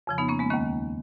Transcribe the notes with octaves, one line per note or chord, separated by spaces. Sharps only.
F2 C#3 F3
B3 D#4
A#3 C#4
G#3 B3
D#2 D#3 A#3 C#4